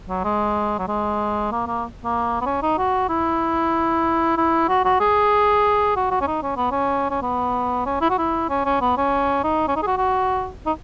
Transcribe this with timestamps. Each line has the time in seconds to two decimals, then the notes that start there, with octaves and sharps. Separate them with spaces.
0.09 F#3
0.24 G#3
0.79 F#3
0.87 G#3
1.52 A#3
1.67 A#3
2.04 A#3
2.41 B3
2.46 C#4
2.62 D#4
2.78 F#4
3.09 E4
4.37 E4
4.69 F#4
4.85 F#4
5.00 G#4
5.96 F#4
6.11 F#4
6.21 C#4
6.27 D#4
6.43 C#4
6.57 B3
6.71 C#4
7.11 C#4
7.22 B3
7.86 C#4
8.01 E4
8.10 F#4
8.18 E4
8.50 C#4
8.65 C#4
8.81 B3
8.97 C#4
9.44 D#4
9.68 C#4
9.76 D#4
9.83 G#4
9.87 F#4
9.97 F#4
10.66 D#4